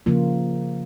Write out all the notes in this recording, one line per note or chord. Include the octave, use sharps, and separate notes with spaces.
C#3 F3 A#3 F4